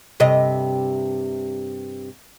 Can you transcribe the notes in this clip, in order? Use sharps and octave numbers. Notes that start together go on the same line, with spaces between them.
G2 C3 D#5